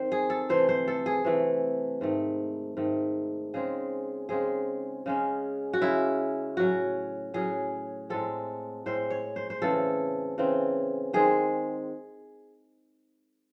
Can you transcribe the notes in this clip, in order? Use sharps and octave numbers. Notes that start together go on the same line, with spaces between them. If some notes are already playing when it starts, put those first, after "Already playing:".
Already playing: D#3 C4 C5
G#4
A4
C3 E3 A3 C5
C5
A4
G#4
C3 E3 A3
G#2 D#3 A3
G#2 D#3 A3
C#3 G#3 C4 G#4
C#3 G#3 C4 G#4
C#3 G#3 C#4
F#4
C#3 G#3 C#4 E4
A2 F#3 C#4 F#4
A2 F#3 C#4 G#4
A2 G#3 C4 A4
A2 G#3 C4 C5
C#5
C5
C5
C#3 E3 C4 A4
C#3 E3 C4
D#3 G#3 C4 G#4